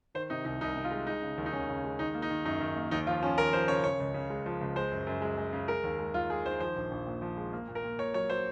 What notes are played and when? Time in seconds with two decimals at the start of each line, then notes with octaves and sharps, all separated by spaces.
0.15 D#3 C5
0.30 C3 D#4
0.45 C2 D#4
0.61 C2 D#4
0.76 C3
0.84 F4
0.91 G#3
1.07 G#3 D#4
1.22 C#3
1.38 D#2
1.46 D#4
1.53 D#2 C#4
1.69 C#3
1.84 G#3
1.99 D#3 D#4
2.15 A#3
2.22 D#4
2.30 D#3
2.45 F#2 D#4
2.61 D#3
2.76 A#3
2.91 D#2 D#4
3.07 F3 F4
3.22 F3 C#4
3.38 D#2 A#4
3.53 F3 C5
3.68 C#3 C#5
3.84 C#3 C#5
4.00 C#2
4.14 C#3
4.30 G#3
4.46 F3
4.61 C#2
4.76 G#3 C5
4.91 F#2
5.07 F#2
5.22 G#3
5.38 G#3
5.53 C#3
5.68 G#3 A#4
5.84 D#2
5.99 G#3
6.14 D#2 F4
6.30 G#3 G#4
6.45 D#3 C5
6.60 F3 C5
6.76 A#1
6.91 A#1
7.07 A#2
7.22 F3
7.37 G#3
7.53 A#3
7.68 A#2
7.75 A#4
7.84 A#2
7.99 A#2 C#5
8.14 F#3 C#5
8.30 F#3 C5